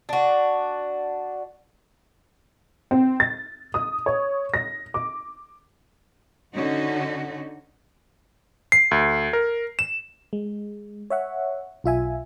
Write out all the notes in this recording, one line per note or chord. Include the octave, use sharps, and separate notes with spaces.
D4 F#4
C4
A6
D#6
C#5
A#6
D6
D3 C#4 D#4 F#4
C7
D2
A#4
E7
G#3
C#5 E5 F#5
B1 F4 E5 G#5